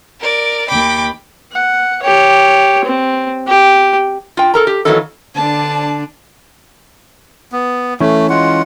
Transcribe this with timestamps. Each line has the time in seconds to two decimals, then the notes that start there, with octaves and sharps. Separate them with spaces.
0.20 A#4 D5
0.69 D#2 G5 B5 D6
1.52 F#5
2.02 G4 C#5
2.85 C4
3.47 G4
4.37 F4 G5
4.54 A4 A#4 A#5
4.67 G4
4.85 D#3 E3 F#3 A#3 D#4 A4
5.36 D3 D4 A5
7.52 B3
8.00 E3 A3 C#4
8.30 G#3 F4 F#5